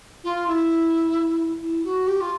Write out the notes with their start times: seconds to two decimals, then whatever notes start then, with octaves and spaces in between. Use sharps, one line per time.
0.24 F4
0.47 E4
1.61 E4
1.84 F#4
2.07 G4
2.21 F4